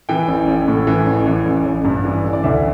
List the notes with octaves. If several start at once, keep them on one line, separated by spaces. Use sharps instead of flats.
E3 G5
A1
A1
A2
E3
A1
E3
A1
A1
G2
E3
A1
D5
D2 E5